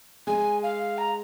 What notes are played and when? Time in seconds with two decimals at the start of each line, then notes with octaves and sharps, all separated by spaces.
0.26 G#3 G#5
0.63 F5
0.98 A#5